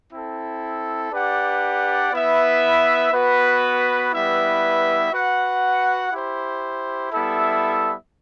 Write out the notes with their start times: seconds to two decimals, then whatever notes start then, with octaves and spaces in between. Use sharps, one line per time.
0.11 C4 E4 A4
1.12 D4 G4 B4 D5 F#5
2.12 B3 E4 B4 E5
3.12 B3 F#4 B4
4.12 G3 B3 E4 B4 E5
5.12 F#4 B4 F#5
6.12 E4 G4 C5
7.12 G3 B3 E4 A4 E5